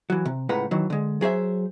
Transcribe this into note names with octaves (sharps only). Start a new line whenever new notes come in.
E3 F#3
C3
C#2 A2 B4 F#5 A#5
D#3 E3 F#3
D3 G#3
F#3 G#4 C5 E5